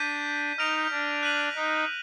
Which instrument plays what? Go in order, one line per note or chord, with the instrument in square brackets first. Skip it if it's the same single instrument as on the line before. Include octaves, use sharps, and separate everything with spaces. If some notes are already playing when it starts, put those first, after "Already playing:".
Already playing: [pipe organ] D4 [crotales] G6 B6 D#7
[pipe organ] D#4 [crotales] F6 A#6 D7 F7
[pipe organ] D4
[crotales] F#6 B6 D#7 F#7
[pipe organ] D#4